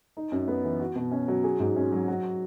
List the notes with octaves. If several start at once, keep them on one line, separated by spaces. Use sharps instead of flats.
D#4
F#2
B3
E3
F#4
B2
C#4
F#3
G#4
G#2
C#4
F#3
F#4